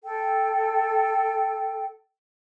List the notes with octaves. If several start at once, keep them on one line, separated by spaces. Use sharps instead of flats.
A4 G5